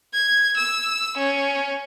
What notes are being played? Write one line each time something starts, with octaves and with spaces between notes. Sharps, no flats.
G#6
E6
C#4